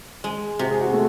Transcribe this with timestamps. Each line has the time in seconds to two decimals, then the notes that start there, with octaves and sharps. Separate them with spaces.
0.24 G#3 G#4
0.59 C3 F#4
0.71 G#4
0.81 F#4
0.93 A3